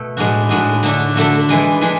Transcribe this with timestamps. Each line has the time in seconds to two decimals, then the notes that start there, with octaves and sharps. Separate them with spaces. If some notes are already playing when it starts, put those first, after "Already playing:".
Already playing: B2 A3
0.17 A2 G#3 D4 F#4
0.49 A2 G#3 D4 F#4
0.83 D3 A3 D4 F#4
1.15 D3 A3 D4 F#4
1.49 E3 G#3 D4
1.81 E3 G#3 D4